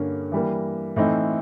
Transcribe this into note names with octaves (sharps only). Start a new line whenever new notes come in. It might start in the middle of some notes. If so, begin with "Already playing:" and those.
Already playing: G2 D3 G3 A#3 C#4
E3 G3 A#3
A2 E3 A3 C4 D#4